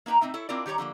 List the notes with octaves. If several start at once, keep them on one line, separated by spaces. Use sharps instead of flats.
A#3 D#4 B4 G5 A#5
A2 C4 D#4 E5
E4 A4 C#5
C4 D4 E4 F4 A#4 D5
D#3 G3 G4 C#5 A#5
D3 F3 G#3 A#3